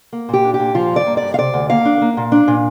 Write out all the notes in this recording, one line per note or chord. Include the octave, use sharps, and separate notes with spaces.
A#3
A#2 G4
D4
G4
A#2
F3 F4
G2 D5
A#3
D5
G2
F5
C3 D5
D2
A#3 F5
D4
A#3
A#2
D4
A#2